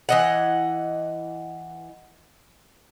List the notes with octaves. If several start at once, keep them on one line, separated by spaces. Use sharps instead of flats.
E3 D#5 F#5